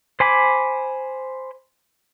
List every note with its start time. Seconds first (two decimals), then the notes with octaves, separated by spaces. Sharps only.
0.20 C5 G#5 B5 D6